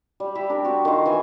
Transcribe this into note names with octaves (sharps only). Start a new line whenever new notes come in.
G3
E4 G4 E5
D4 A#4
C4 F#4
D#3 F4
E3 F#4 G#5